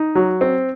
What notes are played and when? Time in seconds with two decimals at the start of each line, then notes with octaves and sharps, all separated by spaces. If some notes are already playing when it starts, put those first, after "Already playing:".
Already playing: D#4
0.15 F#3
0.41 C4